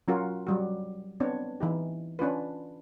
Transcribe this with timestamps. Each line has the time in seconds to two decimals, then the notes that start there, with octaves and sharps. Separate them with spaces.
0.08 F#3 C#4 F4 F#4 A#4
0.47 F#3 G3 F#4
1.20 B3 C4 D4 C#5
1.60 E3 D#4 G4
2.19 C#4 D4 F4 B4